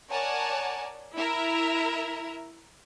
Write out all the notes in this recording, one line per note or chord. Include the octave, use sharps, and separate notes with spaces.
A#4 C#5 D5 F#5 G#5 A5
E4 A#4 E5